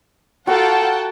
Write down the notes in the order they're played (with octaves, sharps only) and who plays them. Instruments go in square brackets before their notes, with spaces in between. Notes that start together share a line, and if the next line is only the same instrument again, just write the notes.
[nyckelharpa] F4 A4 [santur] F#4 A#5 [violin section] F#5 G5 A5